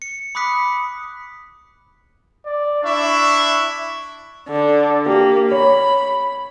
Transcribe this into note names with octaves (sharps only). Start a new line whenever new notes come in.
C#7
B5 D6 D#6 F#6 B6 C#7
D5
D4 E4 E5 C#6
D3
A#3 G4
C#5 B5